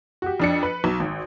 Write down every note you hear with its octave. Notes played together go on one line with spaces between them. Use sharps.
F#4 G4
F2 D4 C#7
B4
B1
G#1